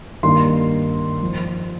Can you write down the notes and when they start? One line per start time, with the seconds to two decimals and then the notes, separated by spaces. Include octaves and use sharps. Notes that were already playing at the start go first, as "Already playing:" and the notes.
0.23 G2 D#3 A#3 C6
1.22 F3